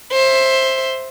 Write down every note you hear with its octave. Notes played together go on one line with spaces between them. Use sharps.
C5 E5